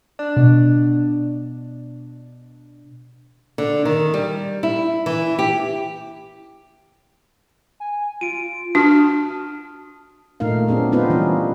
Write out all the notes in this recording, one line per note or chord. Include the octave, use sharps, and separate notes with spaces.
D4
B2
D3
D#3
G3
E4
E3
G4
G#5
F4 D7 D#7
D4 F#4 A5 D#6 F6
A#2 A3 D#4 A#4 F5
B3 C4 D4 G#4
B3 C4 D#4 F4 B4 C5
E3 G3 C#4